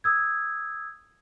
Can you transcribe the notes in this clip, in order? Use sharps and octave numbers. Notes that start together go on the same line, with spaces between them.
D#6 E6 G#6